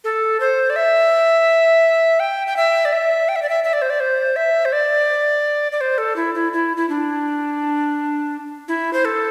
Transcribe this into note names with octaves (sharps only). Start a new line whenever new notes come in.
A4
C5
D5
E5
G5
G5
E5
D5
E5
G5
E5
D5
E5
E5
D5
C5
D5
C5
E5
C5
D5
D5
C5
A4
E4
E4
E4
E4
D4
E4
C5
A4